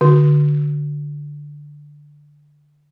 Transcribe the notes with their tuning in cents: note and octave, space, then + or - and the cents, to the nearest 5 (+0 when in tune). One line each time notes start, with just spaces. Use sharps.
D3 +0 F#4 +0